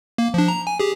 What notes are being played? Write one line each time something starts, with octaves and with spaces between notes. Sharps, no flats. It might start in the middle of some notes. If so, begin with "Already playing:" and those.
A#3
F3 D4
A#5
G#5
G4 G#4